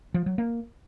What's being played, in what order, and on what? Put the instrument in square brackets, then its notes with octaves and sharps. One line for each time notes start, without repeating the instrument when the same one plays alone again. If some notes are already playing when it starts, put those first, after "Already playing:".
[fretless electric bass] F3
F#3
A#3